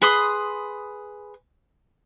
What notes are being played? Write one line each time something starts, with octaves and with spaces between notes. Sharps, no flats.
G#4 B4 C6 D#6